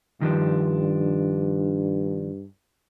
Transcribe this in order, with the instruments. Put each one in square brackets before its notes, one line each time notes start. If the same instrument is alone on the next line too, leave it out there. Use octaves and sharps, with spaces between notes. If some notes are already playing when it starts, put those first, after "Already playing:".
[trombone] G2 [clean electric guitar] D#3 F3 D4